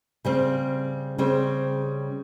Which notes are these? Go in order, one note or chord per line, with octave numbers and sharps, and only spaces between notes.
C#3 G3 C4
C#3 G3 C4